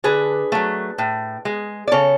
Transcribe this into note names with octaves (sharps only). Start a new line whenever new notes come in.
D3 G#4 B4
F#3 A3
A2
G#3
D5
C#3 A4 C#5